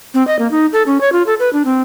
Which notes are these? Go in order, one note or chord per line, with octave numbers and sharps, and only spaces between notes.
C4
D#5
A#3
D#4
A4
C#4
C#5
F4
A4
B4
D4
C4